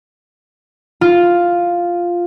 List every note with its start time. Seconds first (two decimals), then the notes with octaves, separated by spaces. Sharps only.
1.01 F4